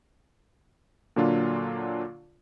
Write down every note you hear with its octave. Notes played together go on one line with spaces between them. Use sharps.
A#2 D3 F#3 A#3 D4 F4